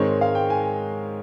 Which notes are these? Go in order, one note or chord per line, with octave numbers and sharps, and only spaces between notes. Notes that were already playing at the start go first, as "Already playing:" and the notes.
Already playing: G#2 D#3 G#3 C4 C#5
F5
G5
G#5